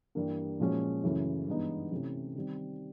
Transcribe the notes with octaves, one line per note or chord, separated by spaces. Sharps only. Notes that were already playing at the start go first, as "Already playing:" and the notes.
G2 E3 G3 A#3
A#2 F3 G#3 C#4 F#4
F#2 C#3 E3 A3
G2 E3 G#3 B3 D#4
C3 E3 A3 C#4
D#3 G3 C4